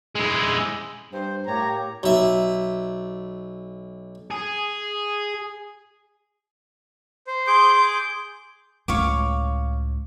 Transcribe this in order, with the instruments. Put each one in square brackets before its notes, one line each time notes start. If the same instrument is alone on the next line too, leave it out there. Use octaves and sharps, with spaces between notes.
[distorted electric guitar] G#3 E4
[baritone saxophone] G2 [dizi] C5
[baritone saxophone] A2 [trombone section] A#3 G4 [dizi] C#5 [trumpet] A#5
[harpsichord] B1 E5
[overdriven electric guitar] G#4
[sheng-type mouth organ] C5
[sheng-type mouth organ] G#4 D6 G6 [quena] C6
[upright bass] C#2 A2 [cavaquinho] C#5 F5 D6